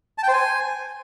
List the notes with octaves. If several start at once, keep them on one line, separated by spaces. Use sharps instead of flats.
A5
G5
C5
G#5